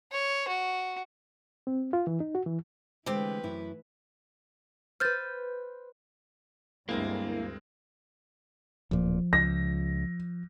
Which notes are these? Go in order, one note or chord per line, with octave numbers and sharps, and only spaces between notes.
C#5
F#4
C4
F4
E3
D#4
F#4
E3
D3 E3 G#3 A3 C4 G4 B4
F#2 E4
B4 C5 F6 G6 A6
D2 G2 G#3 A#3 C4 E4 A#4
D1 A#2 F3
C#2 A#6